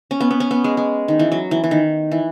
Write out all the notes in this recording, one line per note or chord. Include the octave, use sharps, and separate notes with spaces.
C#4
B3
B3
C#4
B3
G#3
G#3
D#3
E3
F#3
E3
E3
D#3
E3